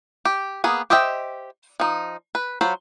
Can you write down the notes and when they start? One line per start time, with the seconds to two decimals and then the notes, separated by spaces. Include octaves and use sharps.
0.25 G4
0.64 A#3 B3 G#4
0.90 G4 C5 D#5 E5 G5
1.80 F3 D#4
2.35 B4
2.61 F#3 F4 C5 B5